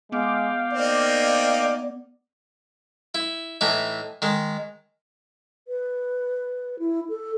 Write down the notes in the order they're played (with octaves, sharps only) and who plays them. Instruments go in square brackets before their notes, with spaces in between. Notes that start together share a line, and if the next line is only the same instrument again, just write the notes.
[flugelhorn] G#3 [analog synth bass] B3 [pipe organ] F5 G5 D6
[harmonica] A#3 C4 D#4 [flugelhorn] D5
[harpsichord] E4
A2 E3 D#4 E5
D#3 G#3
[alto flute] B4
E4
A4